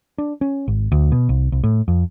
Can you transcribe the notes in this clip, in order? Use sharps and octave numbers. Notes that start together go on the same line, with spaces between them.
D4
C#4
G#1
D2
B2
C2
C2
A2
F2